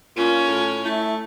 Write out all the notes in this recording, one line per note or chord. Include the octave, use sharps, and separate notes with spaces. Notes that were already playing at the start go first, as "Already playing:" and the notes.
A#2 C#4 F4
A2
A3 E4